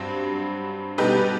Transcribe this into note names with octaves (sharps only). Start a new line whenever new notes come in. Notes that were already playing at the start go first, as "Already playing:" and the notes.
Already playing: G2 F#3 C4
B2 G3 D#4 G4 B4